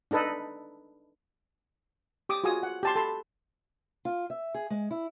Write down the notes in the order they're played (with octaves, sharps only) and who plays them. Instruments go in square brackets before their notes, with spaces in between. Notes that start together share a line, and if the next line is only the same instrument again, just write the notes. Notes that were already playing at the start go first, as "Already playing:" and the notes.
[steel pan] D4 D#4 A4 B4 D#5
G4 D6 D#6
F4 F#4 G#4 G#5 D#6
F#5
G4 A5 C6
A4 A5 B5 C6
[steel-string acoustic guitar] F4
E5
G#4
G#3
E4